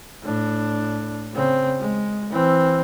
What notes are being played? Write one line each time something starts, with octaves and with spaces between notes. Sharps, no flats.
A2 D4
C#3 C4
G#3
E3 C4